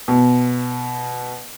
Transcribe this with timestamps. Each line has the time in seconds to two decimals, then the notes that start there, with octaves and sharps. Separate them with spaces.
0.08 B2